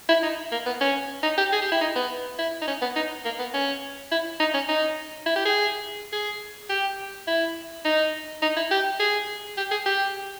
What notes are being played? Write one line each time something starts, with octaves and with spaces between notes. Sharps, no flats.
E4
D#4
A#3
B3
C#4
D#4
G4
G#4
G4
E4
D#4
B3
E4
D#4
C#4
B3
D#4
A#3
B3
C#4
E4
D#4
C#4
D#4
E4
G4
G#4
G#4
G4
E4
D#4
D#4
E4
G4
G#4
G4
G#4
G4